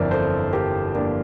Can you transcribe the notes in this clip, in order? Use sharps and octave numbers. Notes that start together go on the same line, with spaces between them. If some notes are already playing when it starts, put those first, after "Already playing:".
Already playing: G1 F2 E3 A#4 C5 D5 E5
A4 C5
G4 A#4
A#3 D4